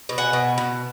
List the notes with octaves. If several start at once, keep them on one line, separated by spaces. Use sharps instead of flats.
B2
F#5 G#5
B2
B2